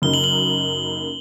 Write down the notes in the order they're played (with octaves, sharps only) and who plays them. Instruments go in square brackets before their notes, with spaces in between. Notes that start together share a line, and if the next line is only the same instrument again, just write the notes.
[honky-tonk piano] F#2 C#3 F#3 A#3 D#4 [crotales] G7
[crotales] F#7
F#7